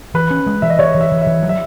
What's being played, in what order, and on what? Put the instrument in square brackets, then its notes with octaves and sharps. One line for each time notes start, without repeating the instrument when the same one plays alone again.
[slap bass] E3 [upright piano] B4
[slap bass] C#4
G#3
[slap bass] E3 [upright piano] E5
[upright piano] D#5
[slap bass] E3 [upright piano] C#5
[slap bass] E3
[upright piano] E5
[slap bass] E3
[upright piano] E5
[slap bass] E3
F#3
[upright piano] E5